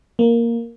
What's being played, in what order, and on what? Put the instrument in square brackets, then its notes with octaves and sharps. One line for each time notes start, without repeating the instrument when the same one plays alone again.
[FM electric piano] A#3